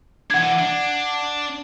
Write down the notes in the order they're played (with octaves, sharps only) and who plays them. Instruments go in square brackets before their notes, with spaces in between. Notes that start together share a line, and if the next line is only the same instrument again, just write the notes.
[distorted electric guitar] E3 D4 [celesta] F#5 G#6
[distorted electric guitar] D4